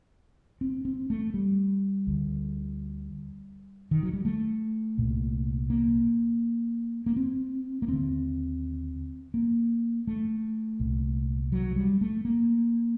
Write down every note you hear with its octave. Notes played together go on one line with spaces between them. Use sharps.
C4
C4
A3
G3
D2 D3
D#3
F#3
G3
A3
C2 A#2
A#3
A#3
C4
A#3
D#2 D3 C4
A#3
A3
C2 A#2
F#3
G3
A3
A#3